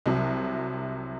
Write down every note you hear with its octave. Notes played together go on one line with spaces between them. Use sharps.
C2 C3 F#3